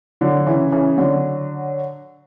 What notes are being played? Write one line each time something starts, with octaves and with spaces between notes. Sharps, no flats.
D3 F#3
C#3 E3
C#3 E3
D3 F#3